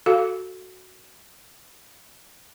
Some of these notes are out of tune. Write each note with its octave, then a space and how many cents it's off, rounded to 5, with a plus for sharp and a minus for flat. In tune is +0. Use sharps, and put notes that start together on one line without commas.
F#4 +0 A4 +0 F5 +0